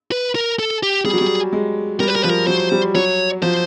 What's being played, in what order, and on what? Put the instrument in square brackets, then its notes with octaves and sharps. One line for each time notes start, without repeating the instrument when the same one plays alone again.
[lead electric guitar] B4
A#4
A4
G4
[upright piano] G3 [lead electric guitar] G#4
[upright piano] F#3
G3
G#3
[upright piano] G3 [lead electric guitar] A#4
[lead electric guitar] B4
A#4
[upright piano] F3 [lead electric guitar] B4
[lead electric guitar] A#4
[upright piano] F#3 [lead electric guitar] C5
[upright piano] G3
[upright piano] F#3 [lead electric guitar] C#5
[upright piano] F3 [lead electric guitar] C5